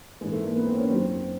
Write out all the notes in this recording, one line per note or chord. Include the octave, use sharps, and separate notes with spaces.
G#2 E3 G#3
A3
A#3
B3
C4
C#4
F#2 D#3 F#3 C4